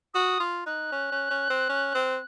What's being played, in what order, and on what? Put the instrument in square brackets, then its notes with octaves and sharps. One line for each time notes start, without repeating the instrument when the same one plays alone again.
[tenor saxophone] F#4 [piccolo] D#6
[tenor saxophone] F4
[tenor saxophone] D#4 [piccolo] F#6
[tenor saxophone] C#4
C#4
C#4
C4
C#4
C4